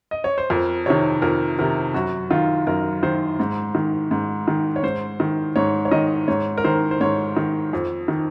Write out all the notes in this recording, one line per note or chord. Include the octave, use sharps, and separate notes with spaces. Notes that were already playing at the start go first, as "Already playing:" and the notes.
D#5
C#5
C5
F2 A#4
C3 D#3 C#5
F2 A#4
C3 D#3 A#4
F#2 F#4
D#3 F4
F#2 A#4
D#3 C5
G#2
D#3
G#2
D#3
C#5
G#2 C5
D#3
G#2 C#5
C#5
D#3 D#5
G#2 C#5
A#4
D#3 C5
C5
G#2 C#5
D#3
F2
D#3